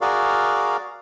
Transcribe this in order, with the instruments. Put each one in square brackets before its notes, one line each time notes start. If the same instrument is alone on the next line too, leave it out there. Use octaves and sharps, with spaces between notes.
[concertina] F#4 G#4 A#4 D5 F5